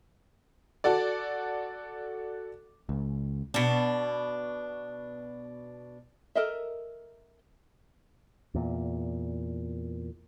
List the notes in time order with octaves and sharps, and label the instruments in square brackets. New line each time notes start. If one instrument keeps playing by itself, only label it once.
[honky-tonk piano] F#4 A4 D5
[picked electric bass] C#2
[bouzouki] B2 D4
[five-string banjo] A4 A#4 D#5 E5
[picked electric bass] E2 A#2